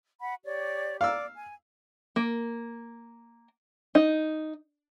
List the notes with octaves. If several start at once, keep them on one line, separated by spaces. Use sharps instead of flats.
F#5 B5
G4 C#5 D5
D5 F5 D6 E6
G#5
A#3
D#4